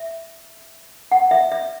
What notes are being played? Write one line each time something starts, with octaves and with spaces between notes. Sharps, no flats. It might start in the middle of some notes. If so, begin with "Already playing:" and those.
Already playing: E5
F#5
E5
E5